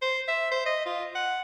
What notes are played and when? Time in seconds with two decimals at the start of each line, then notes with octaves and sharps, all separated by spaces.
0.02 C5
0.28 E5
0.51 C5
0.66 D#5
0.86 F4
1.15 F#5